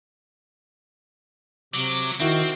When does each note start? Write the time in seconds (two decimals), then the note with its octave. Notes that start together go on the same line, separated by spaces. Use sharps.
1.74 C3 F#3 D6
2.20 D#3 C4 E4 F#4